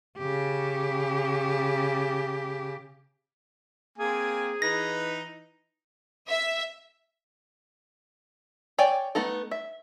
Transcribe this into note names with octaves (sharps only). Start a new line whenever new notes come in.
C#3 G4
A#3 C4 G#4 G#5
E3 D#4 B4 A#6
E5
C#5 D5 G5 G#5
A3 B3 D#4 A4
E5